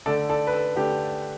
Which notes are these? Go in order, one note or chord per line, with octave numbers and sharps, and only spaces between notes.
D3 A3 D4 A4 D5
A4 D5
B4
A4
D3 A3 D4 G4